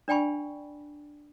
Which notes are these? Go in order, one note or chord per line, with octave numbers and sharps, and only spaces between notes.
D4 D5 G5 G#5 B5 C#6